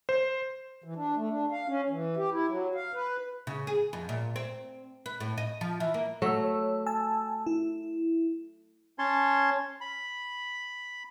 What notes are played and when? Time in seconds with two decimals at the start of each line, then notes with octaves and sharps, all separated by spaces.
0.09 C5
0.84 E3
0.96 D4
1.16 A3
1.29 D4
1.51 F5
1.68 C#4
1.90 E3
2.17 G4
2.32 E4
2.49 F#3
2.75 F5
2.93 B4
3.47 C#3
3.67 G#4
3.93 F2
4.09 A#2
4.36 C4
5.06 B4
5.20 A2
5.38 D#5
5.61 F3
5.80 E3
5.94 A#3
6.22 F#3 A3 C#5 E6
6.86 G#5 A5 E6
7.46 E4
8.99 C#4 C#5 A5 C6
9.81 B5